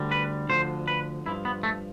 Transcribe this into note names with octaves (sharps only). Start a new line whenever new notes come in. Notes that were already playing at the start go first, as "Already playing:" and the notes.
Already playing: D2 D3 G3
B4
D2 D3 F3 C5
B4
G2 F3 E4
B3
A3